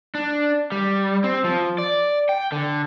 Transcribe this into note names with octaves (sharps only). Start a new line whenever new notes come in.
D4
G3
C4
F3
D5
G5
D3